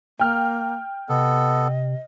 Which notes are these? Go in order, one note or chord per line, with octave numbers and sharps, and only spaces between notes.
A#3 G5 F6
C3 B3 A4 D#5